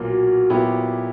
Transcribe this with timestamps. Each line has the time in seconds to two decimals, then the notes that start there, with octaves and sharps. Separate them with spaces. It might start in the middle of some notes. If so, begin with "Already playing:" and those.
Already playing: B1 A#2 A#3
0.10 F#4
0.50 A#2 F#3 B3 E4 G4